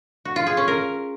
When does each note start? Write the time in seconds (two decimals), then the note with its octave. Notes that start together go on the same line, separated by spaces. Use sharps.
0.25 F#4
0.36 F4
0.47 G#4
0.57 C#4
0.68 A#4